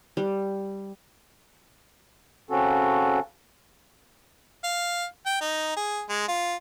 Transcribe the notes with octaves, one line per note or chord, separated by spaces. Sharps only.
G3
C#3 C4 C#4 F#4 A4
F5
G5
D#4
G#4
G#3
F4